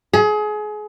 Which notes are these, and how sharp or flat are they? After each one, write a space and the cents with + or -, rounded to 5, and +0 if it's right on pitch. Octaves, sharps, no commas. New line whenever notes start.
G#4 +30